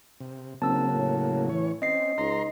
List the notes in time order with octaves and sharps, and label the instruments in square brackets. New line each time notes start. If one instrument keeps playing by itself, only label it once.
[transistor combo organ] C3
[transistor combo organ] C#3 F#3 A#3 [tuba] C4 [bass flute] D#4 [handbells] A5 E6
[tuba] A2 [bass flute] C#5
[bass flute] E3 [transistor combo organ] C#5
[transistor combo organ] C4 [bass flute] C#4 [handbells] D#5 C7
[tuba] C#2 [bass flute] D#4 [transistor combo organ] A#5 C6